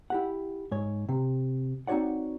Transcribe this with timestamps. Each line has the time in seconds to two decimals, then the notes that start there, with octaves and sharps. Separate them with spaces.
0.10 E4 G4 F#5
0.72 G#2 C#5
1.09 C3
1.87 C4 D#4 F#4 C#5 D5 F#5